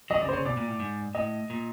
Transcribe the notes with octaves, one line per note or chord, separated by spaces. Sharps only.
F#3 D#5
C#3 D5
C5
C#3 C#5
B2 D5
A#2
A2
G#2
A2 D#5
A#2